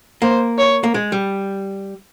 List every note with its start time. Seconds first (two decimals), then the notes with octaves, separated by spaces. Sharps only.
0.22 A#3 C5
0.58 C#5
0.84 A#3
0.94 G#3
1.12 G3